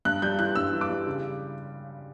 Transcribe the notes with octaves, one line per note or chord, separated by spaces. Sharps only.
G2 F#6
G3 G6
E3 F#6
G2 E6
E3
D6
G3
C#3